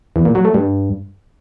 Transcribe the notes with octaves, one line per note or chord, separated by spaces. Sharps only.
E2
A#2
F#3
A3
G2